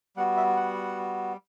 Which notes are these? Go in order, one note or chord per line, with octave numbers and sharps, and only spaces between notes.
G3 B3 F#4 F#5
E5
F#5